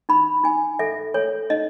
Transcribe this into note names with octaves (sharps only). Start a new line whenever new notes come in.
D#4 B5
D#4 G#5
A4 E5
A4 C#5
D#4 D#5